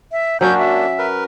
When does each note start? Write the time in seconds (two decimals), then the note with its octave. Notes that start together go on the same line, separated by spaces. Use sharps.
0.12 E5
0.41 F#3 A#3 C#4 D4 F#4 G6
0.58 E5
0.98 A#4 B4